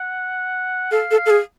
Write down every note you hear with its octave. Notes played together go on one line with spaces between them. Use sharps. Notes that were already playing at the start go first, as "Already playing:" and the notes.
Already playing: F#5
A4 F5
A4
F5
A4
G#4